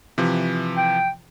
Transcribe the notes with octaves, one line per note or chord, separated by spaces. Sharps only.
C3 E3 F3
G5